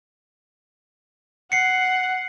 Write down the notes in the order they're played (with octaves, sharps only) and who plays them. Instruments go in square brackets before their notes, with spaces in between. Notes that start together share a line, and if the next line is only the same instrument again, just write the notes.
[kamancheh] F#5 [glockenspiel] C7 C#7